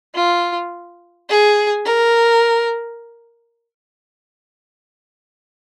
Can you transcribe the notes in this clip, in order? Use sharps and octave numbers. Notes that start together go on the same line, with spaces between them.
F4
G#4
A#4